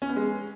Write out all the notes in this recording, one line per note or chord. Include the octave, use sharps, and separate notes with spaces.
C#4
B3
G#3